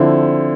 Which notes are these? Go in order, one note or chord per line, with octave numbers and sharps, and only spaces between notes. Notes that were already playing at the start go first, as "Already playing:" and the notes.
Already playing: D3 F3 C4 E4